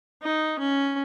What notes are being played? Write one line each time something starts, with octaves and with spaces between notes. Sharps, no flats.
D#4
C#4